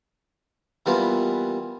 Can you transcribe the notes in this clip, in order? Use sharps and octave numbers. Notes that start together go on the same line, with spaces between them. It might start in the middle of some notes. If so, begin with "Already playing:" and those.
E3 G3 A#3 B3 F4